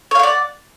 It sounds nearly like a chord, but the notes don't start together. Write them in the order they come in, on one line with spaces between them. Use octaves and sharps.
C#5 F5 F#5 D5